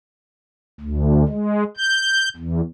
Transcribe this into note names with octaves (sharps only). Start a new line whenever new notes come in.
D2
G#3
G6
E2